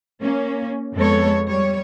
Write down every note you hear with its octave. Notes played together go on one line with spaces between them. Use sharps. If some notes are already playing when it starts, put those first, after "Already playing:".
A#3 C#4
F2 G#3 B3 A4 C#5
G3 C#5